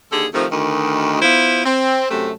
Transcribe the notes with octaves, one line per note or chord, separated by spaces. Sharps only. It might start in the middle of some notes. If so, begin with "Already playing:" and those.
D#2 D3 G#4 A4
C3 D#3 F3 A3
D2 D#3
B3 E4 F4 C5
C4
F#2 C3 A3